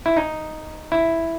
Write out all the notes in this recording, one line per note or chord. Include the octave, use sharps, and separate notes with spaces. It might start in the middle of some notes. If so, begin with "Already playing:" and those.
E4
D#4
E4